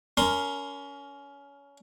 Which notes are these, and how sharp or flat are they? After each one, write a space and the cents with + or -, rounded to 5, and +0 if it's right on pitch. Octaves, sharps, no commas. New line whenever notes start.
C#4 +25 A#4 +0 C6 +0